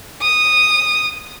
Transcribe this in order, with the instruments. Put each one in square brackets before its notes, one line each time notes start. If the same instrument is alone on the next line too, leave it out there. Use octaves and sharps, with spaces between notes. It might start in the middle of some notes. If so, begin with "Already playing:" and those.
[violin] D#6